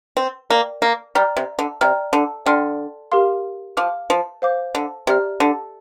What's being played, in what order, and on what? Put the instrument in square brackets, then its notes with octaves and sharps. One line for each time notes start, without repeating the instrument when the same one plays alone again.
[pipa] C4
[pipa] A#3 [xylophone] A#4 D5 G5
[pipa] A#3
[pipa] G3 [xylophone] D5 G5 A#5 F6
[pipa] C3
D3
[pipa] C3 [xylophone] D5 G5 A#5 F6
[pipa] D3
[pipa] D3 [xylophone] D5 G5 C6 F6
[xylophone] G4 A#4 F5 C6 F6
[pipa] F3 [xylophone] F5 D6 F6
[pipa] F3
[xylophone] C5 F5 D6 G6
[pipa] D3
[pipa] C3 [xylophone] G4 D5 A#5 F6
[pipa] D3